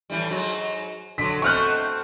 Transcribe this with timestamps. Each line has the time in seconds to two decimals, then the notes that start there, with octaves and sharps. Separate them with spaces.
0.10 A2 E3 G3
0.31 G#2 F#3
1.18 D3 F#3 B6
1.42 B2 A3 C4 C#6 F6 F#6